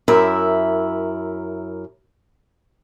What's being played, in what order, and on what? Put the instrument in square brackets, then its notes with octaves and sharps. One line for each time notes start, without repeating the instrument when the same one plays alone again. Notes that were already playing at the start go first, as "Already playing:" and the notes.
[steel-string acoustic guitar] F#2 E4 A#4 E5